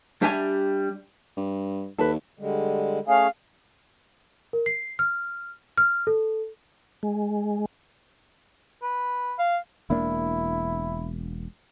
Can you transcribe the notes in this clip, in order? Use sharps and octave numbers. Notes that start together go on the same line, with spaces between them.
G3 D4 G4 E5 G#5
G2
D#2 A4 B4
D3 G3 G#3
A3 C#4 G#4 F5
A#4
C7
F6
F6
A4
G#3
B4
F5
E1 A#3 D4 E4